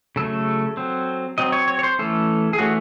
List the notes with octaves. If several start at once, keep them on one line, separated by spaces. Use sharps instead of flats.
C#3 F#3 A3 A4
F#3 C4
F#3 C4 D#5
C#5
C#5
C#5
C5
E3 A3 C#4 A4
G#4
E3 A3 C#4 F#4